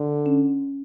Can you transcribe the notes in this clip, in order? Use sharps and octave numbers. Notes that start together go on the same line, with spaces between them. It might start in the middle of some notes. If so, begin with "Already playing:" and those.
Already playing: D3
C#4